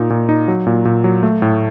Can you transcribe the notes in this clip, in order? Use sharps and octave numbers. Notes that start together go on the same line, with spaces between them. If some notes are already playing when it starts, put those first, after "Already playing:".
Already playing: A#2 D#4
A#2
D#4
F#3
A#2
A#2
F#3
A3
A2